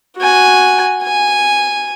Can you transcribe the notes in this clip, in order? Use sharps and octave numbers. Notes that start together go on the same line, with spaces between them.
F#4 G#5
G#5